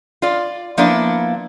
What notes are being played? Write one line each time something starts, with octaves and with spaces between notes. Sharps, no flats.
F4 D5
F3 A#3 B3 D4 E4 D5